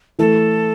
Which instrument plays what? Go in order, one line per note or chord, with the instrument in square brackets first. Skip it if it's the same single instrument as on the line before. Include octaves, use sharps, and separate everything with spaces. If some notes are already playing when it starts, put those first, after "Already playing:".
[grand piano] E3 A3 [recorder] A4